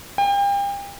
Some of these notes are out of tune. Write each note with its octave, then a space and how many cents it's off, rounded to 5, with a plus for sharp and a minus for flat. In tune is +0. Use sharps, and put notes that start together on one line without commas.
G5 +35